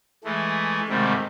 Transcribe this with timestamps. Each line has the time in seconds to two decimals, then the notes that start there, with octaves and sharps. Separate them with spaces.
0.24 E3 G#3 A3
0.89 G#2 C3 D#3 G3 A3